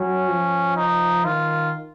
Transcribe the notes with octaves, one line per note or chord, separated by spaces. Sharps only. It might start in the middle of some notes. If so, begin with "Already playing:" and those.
Already playing: F#3 C#4
F3
D#4
D#3 F4